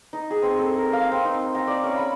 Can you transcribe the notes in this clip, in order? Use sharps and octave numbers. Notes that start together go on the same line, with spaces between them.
D#4
G#4
C4
A4
A#4
F5
C4
D#4
A#5
D5
C#4
B5